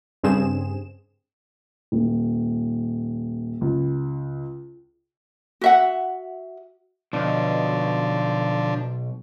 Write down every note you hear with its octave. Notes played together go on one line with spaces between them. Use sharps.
G2 C#3 C4 G#4 E7
D#1
C#2
F#4 E5 F#5
B1 D3 F3 D4